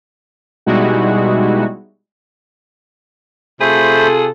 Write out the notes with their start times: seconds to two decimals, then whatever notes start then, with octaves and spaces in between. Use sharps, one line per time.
0.66 B2 G3 G#3 D#4 E4 F#4
3.61 C3 A3 F4 G#4 A4 C5 B5